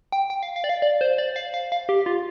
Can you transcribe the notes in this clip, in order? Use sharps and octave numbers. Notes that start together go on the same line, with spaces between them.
G5
G5
F5
F5
D5
F5
D5
C5
D5
F5
F5
F5
G4
F4